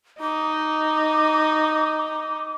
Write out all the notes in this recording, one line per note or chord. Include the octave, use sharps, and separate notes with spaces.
D#4 D6